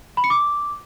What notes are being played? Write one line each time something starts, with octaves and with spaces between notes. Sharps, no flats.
B5
C#7
D6